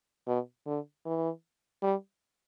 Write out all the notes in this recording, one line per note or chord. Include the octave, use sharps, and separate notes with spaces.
B2
D3
E3
G3